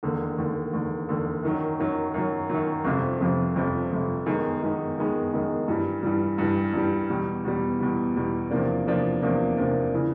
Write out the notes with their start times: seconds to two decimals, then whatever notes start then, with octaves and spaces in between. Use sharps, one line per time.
0.03 E1 D#2 D3
0.38 E1 D#2 D3
0.73 E1 D#2 D3
1.09 E1 D#2 D3
1.43 F#2 D#3 F#3
1.79 F#2 D#3 F#3
2.14 F#2 D#3 F#3
2.50 F#2 D#3 F#3
2.85 G1 F2 C3 F3
3.20 G1 F2 C3 F3
3.56 G1 F2 C3 F3
3.91 G1 F2 C3 F3
4.26 F#2 D#3 G#3 B3
4.62 F#2 D#3 G#3 B3
4.98 F#2 D#3 G#3 B3
5.33 F#2 D#3 G#3 B3
5.68 G2 E3 G3
6.03 G2 E3 G3
6.38 G2 E3 G3
6.74 G2 E3 G3
7.10 E2 B2 G3
7.44 E2 B2 G3
7.80 E2 B2 G3
8.16 E2 B2 G3
8.50 E2 C3 F3 A#3 D4
8.86 E2 C3 F3 A#3 D4
9.22 E2 C3 F3 A#3 D4
9.57 E2 C3 F3 A#3 D4
9.94 C#3 E3